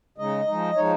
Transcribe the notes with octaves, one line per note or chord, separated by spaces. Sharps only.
C#3 G#3 D#4 D#5
F3 G#3 D#4
F3 G#3 D#4 C#5